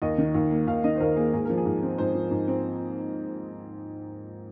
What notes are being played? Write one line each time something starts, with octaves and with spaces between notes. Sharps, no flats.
D#2 D#5
D#3
D#2
A#3
D#2 F5
D#3 D#5
C5
D#2 A#4
A#3 G#4
G#2 G#4
F3 A#4
G#4
G#2
C4
G#2 C5
F3
G#2
C4